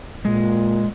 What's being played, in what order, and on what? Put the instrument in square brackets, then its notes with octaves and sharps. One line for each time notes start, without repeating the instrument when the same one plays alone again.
[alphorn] A#2 [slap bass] G#3